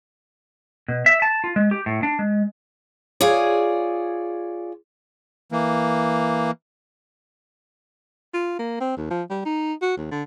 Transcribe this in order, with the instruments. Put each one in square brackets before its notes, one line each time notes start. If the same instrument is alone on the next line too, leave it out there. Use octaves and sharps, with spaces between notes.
[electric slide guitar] B2
E5
A5
F4
G#3
G4
A2
D4
G#3
[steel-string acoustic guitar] F4 G#4 C#5 D5
[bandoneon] E3 A#3
[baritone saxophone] F4
A#3
C4
D#2
F3
G3
D#4
F#4
D#2
D3